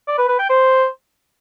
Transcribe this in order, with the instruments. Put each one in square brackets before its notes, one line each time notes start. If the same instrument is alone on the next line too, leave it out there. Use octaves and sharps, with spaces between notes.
[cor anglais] D5
B4
B4
G5
C5